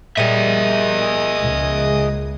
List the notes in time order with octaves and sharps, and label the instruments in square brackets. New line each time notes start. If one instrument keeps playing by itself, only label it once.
[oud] A#2 G3 [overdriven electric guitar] G#4 E5 [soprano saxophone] D#5
[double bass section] C#2 G#3